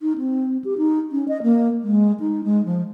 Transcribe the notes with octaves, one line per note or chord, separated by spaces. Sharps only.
D#4
C4
G4
D#4
C#4
D#5
A#3
G#3
D#4
G#3
F3